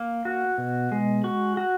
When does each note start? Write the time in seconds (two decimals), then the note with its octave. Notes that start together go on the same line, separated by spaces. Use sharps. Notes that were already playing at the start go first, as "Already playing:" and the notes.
Already playing: A#3
0.25 F#4
0.58 B2
0.92 G#3
1.24 F#4
1.57 F#4